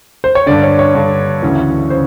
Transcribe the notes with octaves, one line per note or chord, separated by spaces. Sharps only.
C5
C#5
G2 D3 D5
C#5
C#5
G2 D3
D2 C#3 E3
C#3 C5